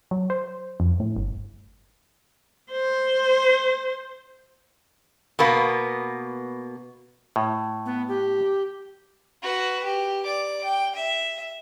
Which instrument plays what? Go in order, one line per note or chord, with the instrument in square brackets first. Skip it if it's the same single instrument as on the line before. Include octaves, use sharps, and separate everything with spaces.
[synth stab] F#3
C5
F2
A2
G1
[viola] C5
[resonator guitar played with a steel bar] B2 A#3 B3
[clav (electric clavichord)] A2
[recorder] B3
G4
[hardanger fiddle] F#4 B4
G4
D5 D6
G5
E5